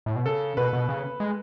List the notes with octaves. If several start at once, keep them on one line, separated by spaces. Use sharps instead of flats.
A2
B2
C#3 A4
B2 B4
B2
C#3
G#3